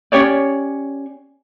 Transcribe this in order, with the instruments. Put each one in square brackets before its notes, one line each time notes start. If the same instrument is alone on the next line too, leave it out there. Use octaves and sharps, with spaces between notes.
[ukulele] C#4 G4 C#5 D5